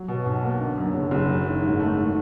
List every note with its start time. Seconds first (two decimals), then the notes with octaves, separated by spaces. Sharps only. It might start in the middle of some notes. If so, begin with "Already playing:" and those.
Already playing: F#3
0.08 B2
0.26 B1
0.43 A#3
0.60 D3
0.78 F#2
0.94 F#1
1.11 F#1
1.29 F#3
1.46 D#3
1.62 G#2
1.80 A3
1.97 D#3